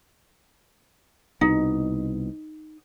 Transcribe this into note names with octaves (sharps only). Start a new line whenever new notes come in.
C2 B2 D#4